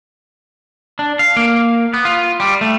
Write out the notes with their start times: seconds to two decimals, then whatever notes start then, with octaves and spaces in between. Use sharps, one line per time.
0.99 D4
1.19 F5
1.36 A#3
1.94 B3
2.05 F4
2.40 G3
2.61 A3